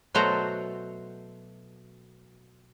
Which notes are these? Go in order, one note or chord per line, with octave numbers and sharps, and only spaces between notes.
B2 F#3 A3 F#4 C5 A#5